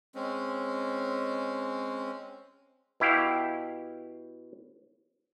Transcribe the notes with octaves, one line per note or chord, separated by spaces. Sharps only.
G#3 C4 C#4
B2 E4 G4 F5